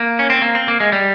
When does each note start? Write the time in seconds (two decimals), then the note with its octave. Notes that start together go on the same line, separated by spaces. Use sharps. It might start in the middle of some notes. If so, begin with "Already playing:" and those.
Already playing: A#3
0.19 C#4
0.30 C4
0.42 A#3
0.55 C4
0.68 A#3
0.80 G#3
0.92 G3